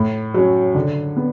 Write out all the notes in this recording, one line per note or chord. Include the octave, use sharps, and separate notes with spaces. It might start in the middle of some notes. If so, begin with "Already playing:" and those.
Already playing: A2
F#3 C#4
D3
B3